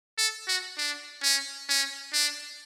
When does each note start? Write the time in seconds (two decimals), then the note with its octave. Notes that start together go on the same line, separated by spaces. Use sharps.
0.18 A4
0.48 F#4
0.78 D4
1.23 C#4
1.69 C#4
2.13 D4